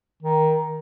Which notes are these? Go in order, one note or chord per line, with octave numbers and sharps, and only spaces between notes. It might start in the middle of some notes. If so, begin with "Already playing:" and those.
D#3